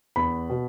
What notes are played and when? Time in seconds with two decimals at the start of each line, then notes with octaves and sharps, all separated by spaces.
0.16 E2 B5
0.50 B2